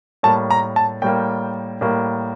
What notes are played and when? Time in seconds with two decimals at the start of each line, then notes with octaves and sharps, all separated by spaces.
0.23 A2 G3 A#3 A5
0.51 A#5
0.76 A5
1.02 A2 G3 A#3 G5
1.81 A2 G3 A#3